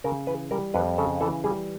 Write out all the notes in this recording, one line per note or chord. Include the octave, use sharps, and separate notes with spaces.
C#3 A#4
E3 B4
G3 A#4
F2 B4
C#3 A4
E3 A4
G3 G#4